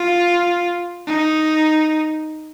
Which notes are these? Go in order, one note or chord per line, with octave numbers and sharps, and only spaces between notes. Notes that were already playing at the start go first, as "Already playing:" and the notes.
Already playing: F4
D#4